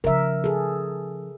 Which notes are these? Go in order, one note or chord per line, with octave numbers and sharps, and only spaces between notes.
C#3 F3 A#4 E5
G#4 A4